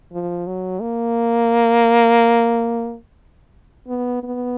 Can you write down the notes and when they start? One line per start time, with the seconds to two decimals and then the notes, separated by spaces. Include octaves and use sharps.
0.13 F3
0.47 F#3
0.80 A#3
3.88 B3
4.23 B3